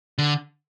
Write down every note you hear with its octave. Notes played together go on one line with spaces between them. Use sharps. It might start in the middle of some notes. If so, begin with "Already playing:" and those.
D3